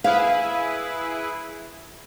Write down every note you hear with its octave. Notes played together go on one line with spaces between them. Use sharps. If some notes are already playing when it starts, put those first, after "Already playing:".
E4 G#4 B4 F5